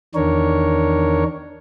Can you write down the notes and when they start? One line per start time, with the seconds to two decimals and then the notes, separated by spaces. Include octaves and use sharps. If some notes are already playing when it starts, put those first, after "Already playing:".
0.15 E2 D#3 D4 A#4 C#5